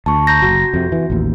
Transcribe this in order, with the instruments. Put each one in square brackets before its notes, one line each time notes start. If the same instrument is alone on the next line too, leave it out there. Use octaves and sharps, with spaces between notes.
[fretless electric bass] D2 [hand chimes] A5 C#6
[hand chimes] A#5 G6 A#6
[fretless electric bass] F#1 [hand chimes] F#4
[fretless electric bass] F2 C3
E3
A1 D#2